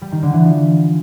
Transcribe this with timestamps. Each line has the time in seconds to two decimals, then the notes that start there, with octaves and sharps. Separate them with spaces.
0.02 G3
0.12 D#3
0.23 D3
0.33 E3
0.44 F3